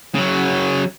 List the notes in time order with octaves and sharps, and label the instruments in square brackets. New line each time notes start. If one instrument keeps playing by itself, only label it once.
[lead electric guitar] C#3 F#3